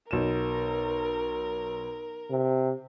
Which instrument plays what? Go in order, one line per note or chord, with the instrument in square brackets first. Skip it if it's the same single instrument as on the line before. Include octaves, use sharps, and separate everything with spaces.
[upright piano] B1 E7 [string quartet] A#4
[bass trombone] C3